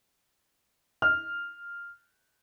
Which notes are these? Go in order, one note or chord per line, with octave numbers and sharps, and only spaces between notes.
F6